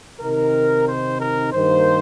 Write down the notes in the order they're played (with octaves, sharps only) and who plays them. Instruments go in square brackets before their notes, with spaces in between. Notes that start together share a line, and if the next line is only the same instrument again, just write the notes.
[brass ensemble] C3 D#3 C4 D#4 A#4
C5
A#4
G2 D#3 A#3 C5